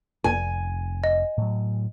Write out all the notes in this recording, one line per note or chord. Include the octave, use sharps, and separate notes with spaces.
F1 G#5
D#5
A2 F#3